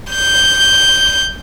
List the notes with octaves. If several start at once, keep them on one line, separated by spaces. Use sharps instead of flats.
G6